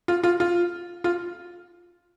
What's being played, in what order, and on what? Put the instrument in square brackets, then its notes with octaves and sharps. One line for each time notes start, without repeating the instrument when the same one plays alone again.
[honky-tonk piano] F4
F4
F4
F4